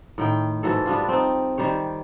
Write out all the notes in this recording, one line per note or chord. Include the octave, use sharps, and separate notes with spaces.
A2 D#3 G5
G#2 E3 F#3 A4
G3 B3 D4 F4
C4 D#4
D#3 G3 C5 C#5